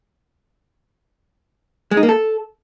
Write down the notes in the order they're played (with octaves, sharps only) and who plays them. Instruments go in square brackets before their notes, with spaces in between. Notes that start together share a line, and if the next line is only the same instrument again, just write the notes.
[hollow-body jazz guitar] G#3
D#4
A#3
A4